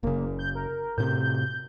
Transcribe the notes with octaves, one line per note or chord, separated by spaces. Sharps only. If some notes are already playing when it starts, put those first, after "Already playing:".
F#1 C#3 A#3
G6
A#4
A2 C3 G6